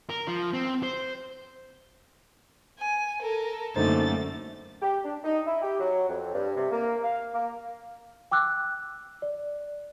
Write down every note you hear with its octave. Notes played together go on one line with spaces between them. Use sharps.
A#4
F3
C4
C5
G#5
A4 A#4
F#2 D3 A3 A#3 D#4 C5 A6
G4
D4
D#4
E4
G4
F#3
F2
G2
C3
A#3
F5
A#3
G5 D6 E6 F#6
D5